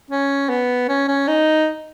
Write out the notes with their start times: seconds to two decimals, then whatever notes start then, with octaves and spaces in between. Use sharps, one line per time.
0.10 C#4
0.49 B3
0.89 C#4
1.08 C#4
1.28 D#4